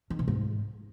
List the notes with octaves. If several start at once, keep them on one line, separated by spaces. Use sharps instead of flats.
D#3
B2
G#2